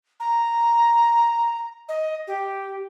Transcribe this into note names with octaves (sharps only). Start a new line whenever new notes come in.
A#5
D#5
G4